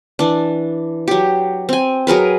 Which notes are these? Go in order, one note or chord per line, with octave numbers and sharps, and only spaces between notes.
E3 D4
F#3 G4
C4 G#5
F#3 G#4 A#4 B4